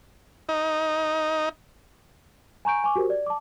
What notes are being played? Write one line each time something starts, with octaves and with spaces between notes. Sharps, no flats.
D#4
G#5 A#5 C#6 G6 D7
G#5 C#6 D6
F#4 G4 A#4 C5
D5
A5 D6